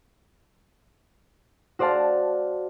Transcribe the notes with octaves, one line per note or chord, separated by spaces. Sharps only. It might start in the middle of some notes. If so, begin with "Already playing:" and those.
F#4 C5 D5 F5 A5